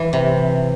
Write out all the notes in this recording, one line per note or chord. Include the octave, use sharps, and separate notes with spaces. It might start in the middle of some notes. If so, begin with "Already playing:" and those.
Already playing: E3
C3